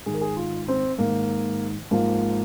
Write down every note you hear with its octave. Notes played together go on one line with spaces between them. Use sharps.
G#2 D#3 G#4
A#4
G#4
F4
C4
G#2 D#3 A#3
G#2 F3 A#3